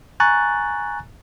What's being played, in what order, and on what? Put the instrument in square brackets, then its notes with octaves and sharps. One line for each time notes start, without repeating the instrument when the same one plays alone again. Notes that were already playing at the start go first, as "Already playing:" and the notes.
[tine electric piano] G#5 A#5 C#6 F#6 A6